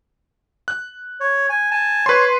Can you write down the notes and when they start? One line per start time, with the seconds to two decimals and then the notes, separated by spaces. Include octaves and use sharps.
0.68 F#6
1.20 C#5
1.49 G#5
1.71 G#5 A5
2.06 B4 C#5 C6